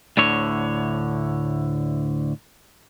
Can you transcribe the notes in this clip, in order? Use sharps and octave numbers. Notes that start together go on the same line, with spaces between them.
D2 A2 D3 C#5